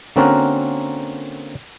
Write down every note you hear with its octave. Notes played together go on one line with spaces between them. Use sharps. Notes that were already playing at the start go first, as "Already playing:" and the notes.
D3 A#3 C4 C#4 F#4 A#4